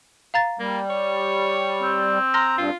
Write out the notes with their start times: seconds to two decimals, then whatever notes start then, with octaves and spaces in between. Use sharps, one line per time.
0.34 F5 A#5 A6
0.59 G3 A#3
0.90 C#5
1.83 C4
2.34 A#5 C6 F6 A#6
2.57 G2 F4